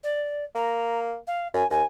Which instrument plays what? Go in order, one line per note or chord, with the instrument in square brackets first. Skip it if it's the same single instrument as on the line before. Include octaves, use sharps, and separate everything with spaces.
[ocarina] D5
[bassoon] A#3 [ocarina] A#5
[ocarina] F5
[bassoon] F#2 [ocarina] G#5
[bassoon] D#2 [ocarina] G#5